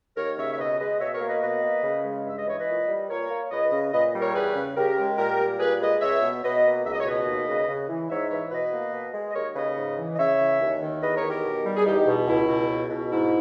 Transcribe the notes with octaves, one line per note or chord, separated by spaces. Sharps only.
D#2 A#4 C#5
C#3 C#5 E5
E5
B2 B4 D#5
G#3 B4 D#5
B2 C#5 E5
A#4 C#5
A#3
B4 D#5
B2 B4 D#5
A#3
C#3
G#3
G2 E5
D#5
E3 C#5
B4 D#5
A#2
G3
A#2 A#4 C#5
A#3
C#2 B4 D#5
C#3
A#2 B4 D#5
G3
A#4 C#5
E2 G#4 B4
C#3
C#3 G4 A#4
G#3
A#2 G4 A#4
G3
A#2 G#4 B4
G#3 B4 D#5
C#2 C#5 E5
B2
B2 B4 D#5
A#3
C#2 E5
D#5
C#5
B2 B4 D#5
D#2
C#3
C#3
E3
G#2 C#5 E5
E3 C#5 E5
B2 B4 D#5
A#3
B2
G#3
D#5
D#2 A#4 C#5
C#3 B4 D#5
G#2
E3
D#5
C#3 C#5 E5
E3
D#2
D#3
E2 B4 D#5
A#4 C#5
D#3
G4 A#4
B2
G3
G#4
E2 D#4 G4
B2
C#2 E4
B2
C#2
B2
G#2 E4